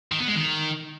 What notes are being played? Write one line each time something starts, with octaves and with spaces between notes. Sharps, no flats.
D#3
B3
G#3
D#3